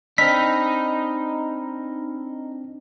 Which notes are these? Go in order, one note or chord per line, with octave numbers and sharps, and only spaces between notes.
C4 D4 D#4 B5 E6 F6 B6